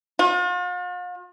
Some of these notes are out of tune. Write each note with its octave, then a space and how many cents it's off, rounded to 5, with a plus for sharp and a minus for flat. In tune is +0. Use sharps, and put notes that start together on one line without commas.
F4 +45